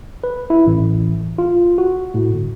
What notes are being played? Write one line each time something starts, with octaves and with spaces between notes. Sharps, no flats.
B4
E4
A1
F4
F#4
A2
G1